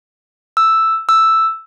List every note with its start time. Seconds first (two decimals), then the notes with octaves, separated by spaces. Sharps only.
0.57 E6
1.09 E6